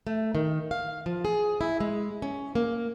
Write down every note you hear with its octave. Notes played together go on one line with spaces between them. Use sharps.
A3
D#3
F5
F3
G#4
E4
G#3
C#4
A#3